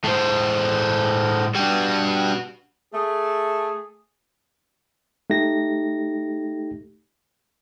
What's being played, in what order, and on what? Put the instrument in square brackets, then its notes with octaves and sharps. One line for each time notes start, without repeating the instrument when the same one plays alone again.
[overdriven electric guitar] A2 G#3 [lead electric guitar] A3 C5
[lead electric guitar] G3 D4 [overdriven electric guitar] F#4 B4
[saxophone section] A3 [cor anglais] G#4
[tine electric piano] A3 D#4 G4 A#6